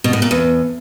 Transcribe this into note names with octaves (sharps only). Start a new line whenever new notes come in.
B2
A2
A#2
E2